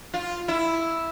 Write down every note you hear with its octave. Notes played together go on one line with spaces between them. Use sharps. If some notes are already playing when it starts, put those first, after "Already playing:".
F4
E4